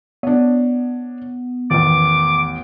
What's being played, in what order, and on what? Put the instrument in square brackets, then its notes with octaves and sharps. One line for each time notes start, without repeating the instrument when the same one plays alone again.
[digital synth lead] B3 [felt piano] D4 C#5
[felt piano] A1 E2 [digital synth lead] D#3 [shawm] D6